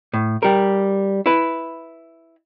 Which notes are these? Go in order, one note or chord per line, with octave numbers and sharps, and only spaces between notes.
A2
G3 A#4
E4 B4